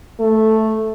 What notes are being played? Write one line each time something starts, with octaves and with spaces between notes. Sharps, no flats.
A3